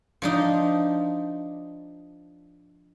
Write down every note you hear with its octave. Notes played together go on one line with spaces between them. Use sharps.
F3 D4 D#4